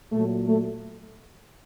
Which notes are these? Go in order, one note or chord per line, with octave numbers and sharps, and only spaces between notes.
A#2 F#3 A3
A3